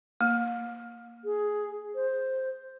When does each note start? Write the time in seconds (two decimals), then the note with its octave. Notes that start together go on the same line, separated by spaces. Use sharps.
0.21 A#3
1.25 G#4
1.95 C5